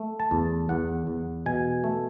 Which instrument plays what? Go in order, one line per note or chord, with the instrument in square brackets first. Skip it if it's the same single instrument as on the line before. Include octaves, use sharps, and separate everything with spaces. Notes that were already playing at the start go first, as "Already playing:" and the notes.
Already playing: [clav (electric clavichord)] A3
A5
E2
E2 F#5
E2
B2 G#5
A3